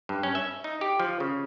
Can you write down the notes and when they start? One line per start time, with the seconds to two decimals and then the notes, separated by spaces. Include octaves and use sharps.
0.09 G2
0.23 C#4
0.35 E5
0.64 D#4
0.81 G4
1.00 F3
1.20 C#3